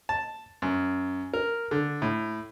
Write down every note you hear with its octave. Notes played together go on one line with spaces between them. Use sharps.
A5
F#2
A#4
D3
A2